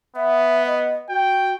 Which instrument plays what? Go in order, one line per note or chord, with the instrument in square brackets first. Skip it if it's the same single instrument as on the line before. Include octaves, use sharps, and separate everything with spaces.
[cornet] B3 [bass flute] E5
[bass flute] D#5
[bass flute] F#4 [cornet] G5